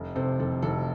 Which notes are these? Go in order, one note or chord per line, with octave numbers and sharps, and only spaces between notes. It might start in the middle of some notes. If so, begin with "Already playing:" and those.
Already playing: F1
C3 A4 C5
F1 A4
F1 A4